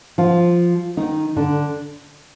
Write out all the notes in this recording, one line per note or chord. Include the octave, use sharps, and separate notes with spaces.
F3 F4
D#3 D#4
D3 D4